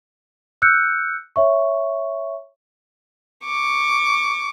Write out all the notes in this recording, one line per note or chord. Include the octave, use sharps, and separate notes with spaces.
E6 F#6 G6 C#7
C#5 E5 C#6
C#6 D6